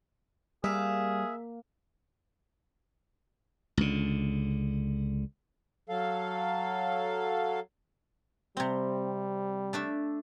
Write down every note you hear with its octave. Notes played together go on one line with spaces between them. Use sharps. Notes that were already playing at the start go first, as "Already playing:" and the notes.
G3 A#3 G#4 E5 F5
C#2 D3
F#3 A4 F5
C3 G3 C4
A3 D4 E5